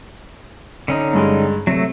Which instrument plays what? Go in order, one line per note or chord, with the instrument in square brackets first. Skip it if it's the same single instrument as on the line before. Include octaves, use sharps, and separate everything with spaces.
[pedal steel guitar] D3 C#4 D#4
[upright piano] G2 G#3
[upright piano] C3 [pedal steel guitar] F#3 A3